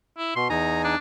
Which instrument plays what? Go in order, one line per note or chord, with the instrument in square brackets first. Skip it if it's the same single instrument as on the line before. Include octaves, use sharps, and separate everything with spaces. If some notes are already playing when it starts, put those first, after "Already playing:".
[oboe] E4
[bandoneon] B2 [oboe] C6
[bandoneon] E2 D#4 G#5 [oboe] A#5
[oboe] D4